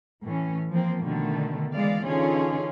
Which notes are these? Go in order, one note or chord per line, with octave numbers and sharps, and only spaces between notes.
A2 E3 C#4
F3 A#3 C4
B2 D3 D#3 A3
E3 G#3 D5 F5
D3 E3 C#4 D#4 F4 G#4